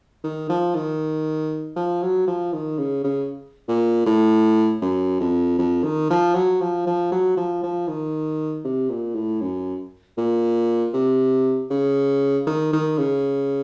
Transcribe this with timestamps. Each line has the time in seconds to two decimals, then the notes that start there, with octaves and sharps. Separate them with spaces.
0.24 D#3
0.50 F3
0.75 D#3
1.76 F3
2.02 F#3
2.27 F3
2.53 D#3
2.78 C#3
3.04 C#3
3.68 A#2
4.06 A2
4.82 F#2
5.20 F2
5.59 F2
5.84 D#3
6.10 F3
6.35 F#3
6.61 F3
6.87 F3
7.12 F#3
7.37 F3
7.63 F3
7.88 D#3
8.65 C3
8.90 A#2
9.15 A2
9.41 F#2
10.18 A#2
10.94 C3
11.71 C#3
12.47 D#3
12.73 D#3
12.98 C#3